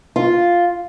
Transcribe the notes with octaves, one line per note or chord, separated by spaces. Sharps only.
F4